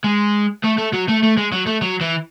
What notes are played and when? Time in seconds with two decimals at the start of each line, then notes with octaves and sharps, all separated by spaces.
0.04 G#3
0.64 A3
0.78 A3
0.93 F#3
1.08 A3
1.23 A3
1.37 G#3
1.52 F#3
1.67 A3
1.82 F#3
2.01 E3